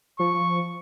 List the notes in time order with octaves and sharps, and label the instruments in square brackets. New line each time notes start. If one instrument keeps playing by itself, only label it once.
[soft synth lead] F3 [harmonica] C#6